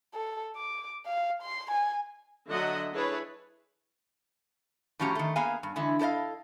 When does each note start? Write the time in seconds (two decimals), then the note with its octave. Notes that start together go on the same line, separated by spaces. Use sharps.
0.14 A4
0.57 D6
1.06 F5
1.42 C6
1.71 G#5
2.49 D3 F#3 D#5 E5 F#5
2.92 D4 E4 G#4 B4 C#5
5.00 A2 F3 C#4 F#4 G4 A#5
5.15 D#3 A3
5.36 A#3 B3 G#4 F5 G#5
5.63 G2
5.76 D3 E3 G#3 E4
5.99 E4 A4 C5 D#5 F5